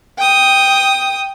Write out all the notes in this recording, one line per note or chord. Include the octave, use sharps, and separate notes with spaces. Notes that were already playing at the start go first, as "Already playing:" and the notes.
G5 D#6